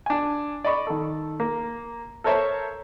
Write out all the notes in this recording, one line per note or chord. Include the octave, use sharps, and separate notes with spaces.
D4 G#5
D5 D#5 B5 C#6
D#3 A4
A#3
A4 A#4 C5 C#5 E5 A5